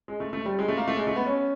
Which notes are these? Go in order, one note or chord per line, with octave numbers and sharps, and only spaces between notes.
G#3
A3
A3
G3
G#3
A3
A#3
A3
G#3
A3
B3
C#4